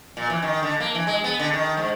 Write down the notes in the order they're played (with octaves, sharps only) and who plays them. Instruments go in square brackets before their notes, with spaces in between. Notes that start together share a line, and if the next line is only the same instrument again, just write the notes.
[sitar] A#2
E3
D#3
D3
A#3
E3
G#3
B3
D3
D#3
G#2